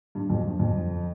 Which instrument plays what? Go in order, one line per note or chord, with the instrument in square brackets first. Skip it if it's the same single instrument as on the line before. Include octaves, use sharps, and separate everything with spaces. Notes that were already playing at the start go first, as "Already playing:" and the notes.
[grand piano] G2
F2
G2
F2